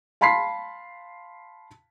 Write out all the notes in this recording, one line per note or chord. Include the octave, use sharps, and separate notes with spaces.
F5 A5 B5 C6 B6 C7